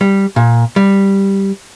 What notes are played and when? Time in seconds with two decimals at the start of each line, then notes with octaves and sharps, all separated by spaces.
0.01 G3
0.36 A#2
0.76 G3